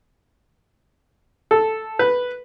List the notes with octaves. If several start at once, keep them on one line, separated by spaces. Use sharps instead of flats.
A4
B4